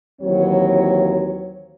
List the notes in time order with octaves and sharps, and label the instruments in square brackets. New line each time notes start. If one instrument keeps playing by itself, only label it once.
[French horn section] D#2 E3 F#3 C4 C#5